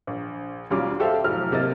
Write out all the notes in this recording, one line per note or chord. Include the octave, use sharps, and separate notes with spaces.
A#1
D#2 B2 G3 C#4 F4 D6
F#4 G4 A4 C5 E5 F5
F1 A2 F#3 F6
C3 A#3 D#5 A6